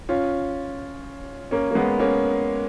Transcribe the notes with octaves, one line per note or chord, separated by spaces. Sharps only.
C#4 F4
A#3 C#4
A#3
G#3 B3
A#3 C#4